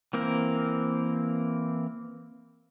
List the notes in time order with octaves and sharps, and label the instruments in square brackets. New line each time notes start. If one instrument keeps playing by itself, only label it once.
[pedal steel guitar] E3 A#3 C4 A#4